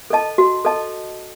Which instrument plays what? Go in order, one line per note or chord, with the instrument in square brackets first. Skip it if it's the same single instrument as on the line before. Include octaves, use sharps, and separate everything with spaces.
[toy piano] A4 D#5 A5
F#4
A4 D#5 A5